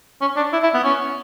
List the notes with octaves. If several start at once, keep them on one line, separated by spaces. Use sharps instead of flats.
C#4
D4
E4
E4
B3
C#4